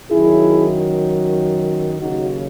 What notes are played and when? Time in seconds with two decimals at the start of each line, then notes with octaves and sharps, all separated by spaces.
0.10 F#2 D#3 F#3 E4 G#4
1.99 D#2 C#3 F#3 D#4 F#4